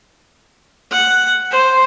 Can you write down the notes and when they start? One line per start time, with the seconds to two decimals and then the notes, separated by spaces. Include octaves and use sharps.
0.92 F#5
1.51 C5